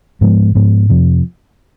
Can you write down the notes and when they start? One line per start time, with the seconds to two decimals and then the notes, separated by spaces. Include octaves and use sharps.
0.21 G#2 F3 G#3 B3
0.55 G#2 F3 G#3 B3
0.90 F2 C3 F3